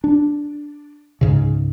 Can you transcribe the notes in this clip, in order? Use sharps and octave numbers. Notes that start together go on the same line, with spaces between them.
D4
C#2 G#2 C#3